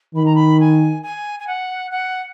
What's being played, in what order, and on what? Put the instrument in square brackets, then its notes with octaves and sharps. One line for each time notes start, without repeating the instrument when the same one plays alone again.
[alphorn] D#3 [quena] B5
[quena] A#5
B5
G#5
G#5
G#5
F#5
F#5